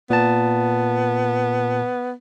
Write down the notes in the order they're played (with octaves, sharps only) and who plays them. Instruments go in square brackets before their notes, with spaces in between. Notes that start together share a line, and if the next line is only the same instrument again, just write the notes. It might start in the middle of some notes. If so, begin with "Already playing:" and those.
[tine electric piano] A#2 A5 [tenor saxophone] B3